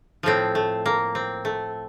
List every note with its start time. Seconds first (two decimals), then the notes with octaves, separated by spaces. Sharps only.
0.23 A2 F3 A3 C4
0.55 A3
0.86 A#3
1.15 C4
1.45 A3